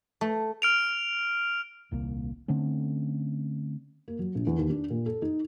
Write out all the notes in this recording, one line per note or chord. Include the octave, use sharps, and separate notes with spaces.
A3
F6 D7 F7
D#1 C2 A#3
D3 A3 C4 C#4
A#3
F#3
A#1
E2
D#2
D4
A#2
A4
D#4